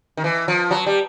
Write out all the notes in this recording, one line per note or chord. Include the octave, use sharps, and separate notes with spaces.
D#3
E3
F3
F#3
G3